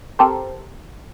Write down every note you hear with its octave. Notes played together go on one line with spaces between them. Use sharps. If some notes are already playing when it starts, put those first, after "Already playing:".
C4 G4 A4 A#4 C5